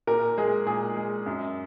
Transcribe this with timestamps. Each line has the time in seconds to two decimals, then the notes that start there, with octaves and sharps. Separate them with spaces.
0.07 A#2 A#4
0.38 G#3 G#4
0.67 A#2 G#4
0.96 G#3
1.26 F#2